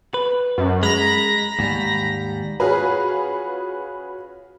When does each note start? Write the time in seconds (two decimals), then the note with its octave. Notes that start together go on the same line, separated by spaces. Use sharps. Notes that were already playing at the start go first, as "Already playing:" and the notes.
0.14 B4
0.58 F#2
0.83 G#3 A#5 B5 A#6
1.59 D#2 G#2 G3
2.60 C#4 F4 F#4 G#4 B4